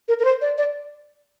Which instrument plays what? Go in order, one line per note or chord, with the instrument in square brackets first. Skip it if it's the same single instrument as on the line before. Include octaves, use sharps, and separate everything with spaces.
[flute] A#4
A#4
C5
D5
D5